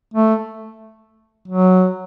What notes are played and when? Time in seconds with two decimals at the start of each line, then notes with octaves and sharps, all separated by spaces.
0.14 A3
1.48 F#3